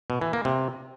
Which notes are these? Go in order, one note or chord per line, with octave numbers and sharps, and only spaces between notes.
B2
E3
A#3
C3